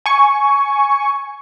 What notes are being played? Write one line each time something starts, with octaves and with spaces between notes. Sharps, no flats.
G#5 C#6